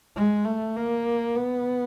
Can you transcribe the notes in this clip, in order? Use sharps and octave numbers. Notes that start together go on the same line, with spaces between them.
G#3
A3
A#3
B3